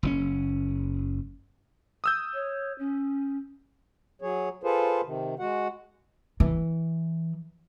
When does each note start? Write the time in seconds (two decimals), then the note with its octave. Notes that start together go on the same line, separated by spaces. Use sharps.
0.03 F#1 A#2 C#4
2.04 D#6 E6 G6
2.34 C#5
2.79 C#4
4.22 F#3 G#4 C#5
4.63 F4 G#4 A4 B4 C5
5.05 C3 D#3
5.39 G#3 F#4 F#5
6.40 E3